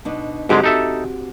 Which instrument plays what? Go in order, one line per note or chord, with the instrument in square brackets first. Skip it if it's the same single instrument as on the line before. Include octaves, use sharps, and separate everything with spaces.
[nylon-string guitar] B2 D4 D#4
[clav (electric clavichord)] G#2 D3 G#3 [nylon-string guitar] C4 F#4 G4
[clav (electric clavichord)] D#4 A4 E5